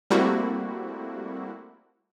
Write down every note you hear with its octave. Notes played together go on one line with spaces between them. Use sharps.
G3 A3 A#3 C4 E4 F#4